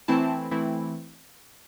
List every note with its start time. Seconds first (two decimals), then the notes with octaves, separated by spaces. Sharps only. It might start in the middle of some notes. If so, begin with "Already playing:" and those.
0.08 E3 A3 C4 E4 A5
0.51 E3 A3 C4 E4